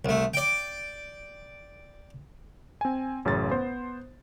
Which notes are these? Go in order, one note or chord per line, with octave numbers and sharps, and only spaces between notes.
C2 A3
D5 G5
C4 G#5
A1 F#2 C#3 C#4 A6
B3 C5